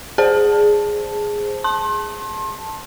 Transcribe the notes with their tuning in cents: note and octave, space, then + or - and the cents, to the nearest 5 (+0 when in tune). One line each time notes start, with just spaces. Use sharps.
G#4 +0 C5 +0 A5 +0
A5 +0 C6 +35